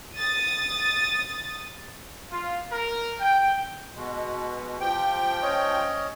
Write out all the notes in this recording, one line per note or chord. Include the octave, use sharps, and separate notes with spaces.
D#6 A6
F4
A#4
G5
B2 G#3
F3 G4 G5
C#4 C#5 D#5